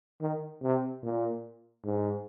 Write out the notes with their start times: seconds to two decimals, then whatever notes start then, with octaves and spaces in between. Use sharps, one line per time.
0.21 D#3
0.62 C3
1.03 A#2
1.85 G#2